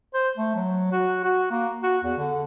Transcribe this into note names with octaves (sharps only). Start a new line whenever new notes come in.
C5
A3
F#3
F#4
F#4
A#3
F#4
E2
D3